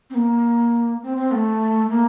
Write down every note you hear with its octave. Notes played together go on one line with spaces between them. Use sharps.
C4
A#3
C4
C4
A3
A#3